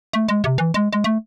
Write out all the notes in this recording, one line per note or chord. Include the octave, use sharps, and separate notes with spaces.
A3
G#3
C3
E3
G#3
G#3
A3